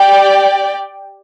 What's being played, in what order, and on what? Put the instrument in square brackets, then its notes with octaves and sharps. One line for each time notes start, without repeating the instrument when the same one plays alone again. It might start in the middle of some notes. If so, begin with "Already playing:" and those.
Already playing: [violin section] G4 D5 G5